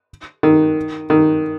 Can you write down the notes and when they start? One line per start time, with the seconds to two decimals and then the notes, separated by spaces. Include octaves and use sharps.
0.43 D#3
1.10 D#3